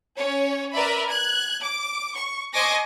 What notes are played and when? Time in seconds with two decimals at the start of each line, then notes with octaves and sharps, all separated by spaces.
0.16 C#4 C#5
0.73 A#4 B4 D5 E5 B5
1.09 F#6 G#6
1.62 D6
2.15 C#6
2.53 C5 D#5 G#5 C#6 D6 A#6